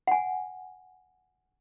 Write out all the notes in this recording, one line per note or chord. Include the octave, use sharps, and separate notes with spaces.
F#5 G#5